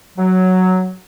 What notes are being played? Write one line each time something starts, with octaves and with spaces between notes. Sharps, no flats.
F#3